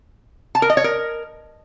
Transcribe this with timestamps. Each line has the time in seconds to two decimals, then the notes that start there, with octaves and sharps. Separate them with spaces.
0.55 A5
0.62 A#4
0.70 D#5
0.77 C#5
0.84 A#4